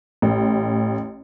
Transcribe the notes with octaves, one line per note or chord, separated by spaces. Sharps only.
A1